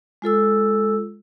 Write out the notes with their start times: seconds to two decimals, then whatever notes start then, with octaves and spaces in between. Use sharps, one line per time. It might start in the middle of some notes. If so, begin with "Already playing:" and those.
0.22 G#3 F4 A4 E6